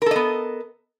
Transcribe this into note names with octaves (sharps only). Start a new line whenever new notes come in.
B3 A4 A#4 D#5